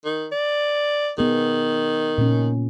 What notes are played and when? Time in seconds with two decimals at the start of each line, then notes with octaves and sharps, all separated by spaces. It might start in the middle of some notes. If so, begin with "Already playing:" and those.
0.05 D#3
0.32 D5
1.18 D#3 B3 G#4
2.18 A#2 C#4